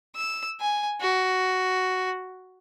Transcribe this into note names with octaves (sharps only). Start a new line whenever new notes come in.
E6
G#5
F#4